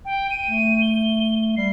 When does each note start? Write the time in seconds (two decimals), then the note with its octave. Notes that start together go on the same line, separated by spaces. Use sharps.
0.05 G5
0.30 D#7
0.47 A3
0.81 G7
1.57 G3 C7